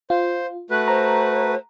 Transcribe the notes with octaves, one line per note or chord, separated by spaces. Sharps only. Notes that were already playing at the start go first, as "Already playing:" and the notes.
F4 C5
A3 F#4 B4 F#6
C5 A#5